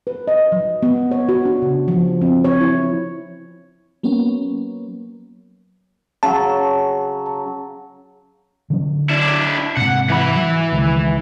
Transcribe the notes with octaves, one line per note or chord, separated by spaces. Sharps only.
B4
D#5
F#3
B3
C#5
F#4
D4
C#3
F3
C4
C#5
E4
F#3 A#3 B3 C#4
C#3 F#3 A5
D3 F#3 C#4
D4 E4
G#2 C3 F#5
E3 B5
F#3
C#2 D#3 G#3